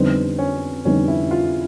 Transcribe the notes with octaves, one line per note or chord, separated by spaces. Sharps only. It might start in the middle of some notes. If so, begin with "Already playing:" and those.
Already playing: F2 D3 G3 B3 C4 D#4
C#4
F2 D3 G3 B3 C#4 D#4
E4
F4